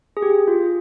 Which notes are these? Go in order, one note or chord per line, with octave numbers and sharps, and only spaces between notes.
G#4
G4
F4